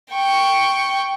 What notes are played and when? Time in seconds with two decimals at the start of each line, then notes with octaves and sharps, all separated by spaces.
0.12 G5 C#6